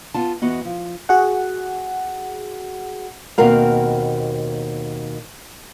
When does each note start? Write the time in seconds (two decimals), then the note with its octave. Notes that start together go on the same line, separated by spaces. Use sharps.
0.14 B3 F4 A5
0.42 E2 B3 F#4 D#5
0.65 F3
1.09 F#4 G#4 F#5
3.38 D#2 B2 C4 F#4 A#4 F5